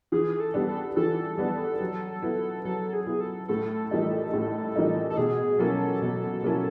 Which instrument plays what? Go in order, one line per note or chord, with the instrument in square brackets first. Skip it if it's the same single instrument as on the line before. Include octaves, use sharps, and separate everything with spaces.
[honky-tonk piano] E3 [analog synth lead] G#4
[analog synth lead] A4
[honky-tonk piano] G3 B3 D4
[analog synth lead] A4
[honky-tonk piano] E3 [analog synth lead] A4
[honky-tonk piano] G3 B3 D4
F#3
B3 E4
[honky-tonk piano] F#3 [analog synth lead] A4
[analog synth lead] G#4
[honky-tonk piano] B3 E4
[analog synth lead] A4
[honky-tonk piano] A2 [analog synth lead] A4
[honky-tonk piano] E3 G3 A#3 D#4
A2
E3 G3 A#3 D#4
[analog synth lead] A4
[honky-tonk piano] B2 [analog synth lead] G#4
[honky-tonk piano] F#3 A#3 C#4 E4 [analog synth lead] A4
[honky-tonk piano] B2
F#3 A#3 C#4 E4